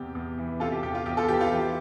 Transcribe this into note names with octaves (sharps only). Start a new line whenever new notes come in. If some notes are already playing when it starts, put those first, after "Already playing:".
Already playing: E2 C3 G4
E2
E3
C3 F4 A4
G4
E2 G4
F4
E2 G4
F4 A4
E3 G4
F4
E3 G4